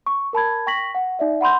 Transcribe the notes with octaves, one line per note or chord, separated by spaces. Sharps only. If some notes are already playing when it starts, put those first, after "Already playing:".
C#6
A#4 A5 B5 G#6
G5 C#6 A#6 B6 F#7
F#5
D#4 D5 E5
F#5 B5 C6 G6